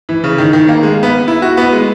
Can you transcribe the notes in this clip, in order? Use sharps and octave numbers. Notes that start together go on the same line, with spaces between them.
E3
C#3
D#3
D#3
A#3
G#3
B3
E4
F#4
B3
G#3